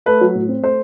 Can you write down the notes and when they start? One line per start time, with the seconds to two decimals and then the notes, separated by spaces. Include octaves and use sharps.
0.06 A3 B4
0.21 F#3
0.35 A2
0.48 C4
0.63 A3 C5